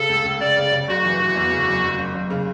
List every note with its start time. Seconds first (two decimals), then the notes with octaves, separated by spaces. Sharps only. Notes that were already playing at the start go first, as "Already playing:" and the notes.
Already playing: C#3 A4
0.09 C#2
0.24 C#2
0.41 C#3 D5
0.56 C#3
0.72 C#3
0.88 F#1 F#4
1.05 E3
1.19 E3
1.36 E2
1.52 C#3
1.68 F#1
1.83 F#1
1.99 F#1
2.14 F#1
2.30 C#3